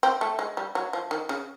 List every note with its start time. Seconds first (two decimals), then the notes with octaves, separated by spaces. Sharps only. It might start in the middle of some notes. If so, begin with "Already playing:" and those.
0.03 C4
0.21 A3
0.39 G#3
0.57 G3
0.75 F#3
0.93 F3
1.11 D#3
1.29 C#3